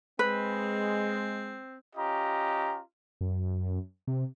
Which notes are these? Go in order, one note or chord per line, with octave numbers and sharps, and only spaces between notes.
G#3 C4 B4
C#4 F4 G4 D#5 A#5
F#2
C3